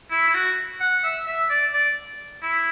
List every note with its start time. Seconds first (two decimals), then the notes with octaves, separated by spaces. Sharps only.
0.11 E4
0.27 E4
0.34 F#4
0.80 F#5
1.03 E5
1.26 E5
1.50 D5
1.73 D5
2.42 E4